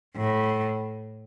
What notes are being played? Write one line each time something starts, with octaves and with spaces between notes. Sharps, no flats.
A2